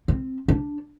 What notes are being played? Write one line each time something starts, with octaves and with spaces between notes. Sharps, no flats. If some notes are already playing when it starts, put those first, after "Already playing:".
C4
D4